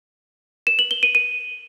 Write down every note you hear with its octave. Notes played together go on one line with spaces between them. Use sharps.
E7
F#7
G7
D#7
D#7